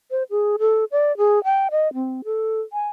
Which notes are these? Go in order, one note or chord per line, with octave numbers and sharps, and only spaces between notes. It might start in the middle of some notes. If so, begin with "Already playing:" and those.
C5
G#4
A4
D5
G#4
G5
D#5
C4
A4
G#5